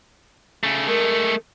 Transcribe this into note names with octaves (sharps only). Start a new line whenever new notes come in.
C#3 A3
G#3 A3 A#4